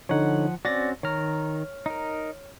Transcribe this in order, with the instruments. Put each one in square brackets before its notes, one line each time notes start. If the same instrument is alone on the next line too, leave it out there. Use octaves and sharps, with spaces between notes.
[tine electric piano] D3 D#4 C#5 [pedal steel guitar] F3 F#5
[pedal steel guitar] C4 C#4 F#4 [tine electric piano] D5 A6 A#6
[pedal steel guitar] D#3 A#5 [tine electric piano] C#5 F6
[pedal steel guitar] D#4 A#4